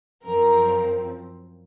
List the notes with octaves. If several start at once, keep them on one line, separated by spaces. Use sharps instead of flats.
F#2 F3 C4 A#4